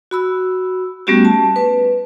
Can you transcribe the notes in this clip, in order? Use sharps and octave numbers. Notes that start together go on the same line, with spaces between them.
F#4 B5 E6
G3 A3 B3 C#4 F#4 G4
A5
B4